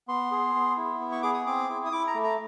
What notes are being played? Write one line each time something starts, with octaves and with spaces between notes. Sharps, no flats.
B3 C6
G#4
B3
E4
B3
C#6
G#4 D6
D#6
C4 D6
E4
D#6
E4 D6
A#5
A3
A#5